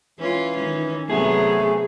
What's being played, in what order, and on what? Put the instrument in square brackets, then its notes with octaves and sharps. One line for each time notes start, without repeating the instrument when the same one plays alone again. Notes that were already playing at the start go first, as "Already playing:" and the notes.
[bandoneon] E3 [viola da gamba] C#4 F4
[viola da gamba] D#3 C#4
[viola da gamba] C3 F#3 B3 [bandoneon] A3 [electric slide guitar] G#4